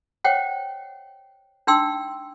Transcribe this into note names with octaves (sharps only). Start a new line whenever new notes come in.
C5 C#5 D#5 F#5 G5
D4 D#4 G5 C6 E6